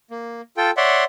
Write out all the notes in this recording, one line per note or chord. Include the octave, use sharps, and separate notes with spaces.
A#3
F4 A4 G5
C#5 D5 E5 F#5 C6